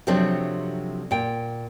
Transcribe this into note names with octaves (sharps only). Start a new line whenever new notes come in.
C3 F3 F#3 A3 C4 D4
A#2 G5